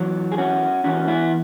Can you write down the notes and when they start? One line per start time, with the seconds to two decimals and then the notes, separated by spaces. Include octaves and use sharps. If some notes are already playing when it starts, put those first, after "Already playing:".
Already playing: E2 E3 F#3
0.32 G#4
0.38 C#4 F#4
0.84 E2 E3 C#4 F#4
1.07 B3 E4